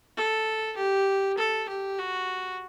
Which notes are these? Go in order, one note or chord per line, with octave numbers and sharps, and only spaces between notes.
A4
G4
A4
G4
F#4